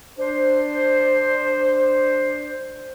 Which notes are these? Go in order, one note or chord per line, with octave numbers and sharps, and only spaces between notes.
D4 C5